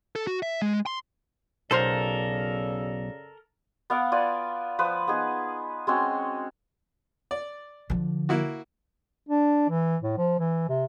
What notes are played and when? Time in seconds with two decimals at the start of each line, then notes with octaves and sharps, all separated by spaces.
0.15 A4
0.27 F#4
0.42 E5
0.62 G#3
0.86 C6
1.71 B1 F#2 C#3 A4 A#4 C5 D5 C6
3.90 B3 F5 F#5 D6
4.12 F4 B4 D5 G#5
4.79 F3 B4 C5 D#6
5.08 B3 D#4 G#4
5.87 G#3 C4 C#4 F#4
7.31 D5
7.90 D3 F3
8.29 A#3 E4 F#4
9.29 D4
9.69 E3
10.02 A2
10.18 F3
10.39 E3
10.69 C3